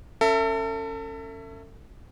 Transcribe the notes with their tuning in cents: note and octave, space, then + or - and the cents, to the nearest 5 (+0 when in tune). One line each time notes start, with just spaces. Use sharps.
C#4 +0 A4 +35 E5 +10